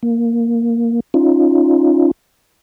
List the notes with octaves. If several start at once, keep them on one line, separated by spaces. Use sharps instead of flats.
A#3
C#4 D#4 F4